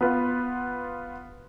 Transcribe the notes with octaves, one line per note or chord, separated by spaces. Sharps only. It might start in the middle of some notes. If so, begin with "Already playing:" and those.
B3 F4 B4